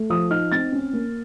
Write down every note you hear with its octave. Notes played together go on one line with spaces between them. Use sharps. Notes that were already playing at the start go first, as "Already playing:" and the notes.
Already playing: A3
F3 D#6
D#4 F6
C4 A6
C#4
A#3